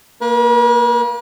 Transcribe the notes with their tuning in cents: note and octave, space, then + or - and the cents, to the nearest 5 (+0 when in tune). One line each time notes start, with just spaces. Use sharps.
A#3 -5 B4 -45